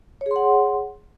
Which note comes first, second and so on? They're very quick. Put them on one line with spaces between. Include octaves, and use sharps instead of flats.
C#5 G#4 C6 F#5